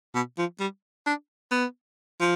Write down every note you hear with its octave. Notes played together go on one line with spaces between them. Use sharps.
B2
F3
G3
D4
B3
F3